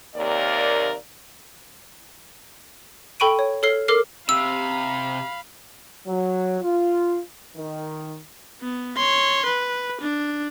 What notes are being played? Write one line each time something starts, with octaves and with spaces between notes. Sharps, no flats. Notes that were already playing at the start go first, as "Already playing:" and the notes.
D#2 C3 A#3 A#4 D5
A4 G5 B5 C#6 D7 D#7
C#5
A4 C#5 F6 C7 G7
A4 A#4 D6 F6 C7
C3 F5 B5 E6
F#3
F4
D#3
B3
C#5 C6
B4
D4